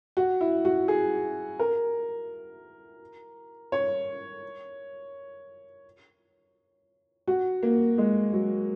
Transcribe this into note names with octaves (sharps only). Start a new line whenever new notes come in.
F#4
E4
F#4
G#4
A#4
C#5
F#4
A#3
G#3
F#3